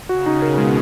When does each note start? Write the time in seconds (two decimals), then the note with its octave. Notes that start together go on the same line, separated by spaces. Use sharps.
0.09 C#3 F#4
0.26 D#4
0.42 B2 A#4
0.58 G#3